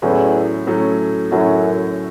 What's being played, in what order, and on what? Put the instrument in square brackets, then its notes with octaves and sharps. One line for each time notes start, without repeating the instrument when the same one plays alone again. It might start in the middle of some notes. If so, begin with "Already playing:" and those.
[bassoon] E2 [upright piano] A2 F#3 A3 C#4
[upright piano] A2 F#3 A3 C#4
[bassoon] F#2 [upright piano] A2 F#3 A3 C#4